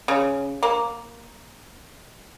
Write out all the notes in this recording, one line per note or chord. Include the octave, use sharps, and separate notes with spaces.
C#3
A#3